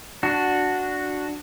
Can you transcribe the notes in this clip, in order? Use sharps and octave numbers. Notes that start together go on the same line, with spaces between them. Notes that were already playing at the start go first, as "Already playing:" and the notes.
D4 F#4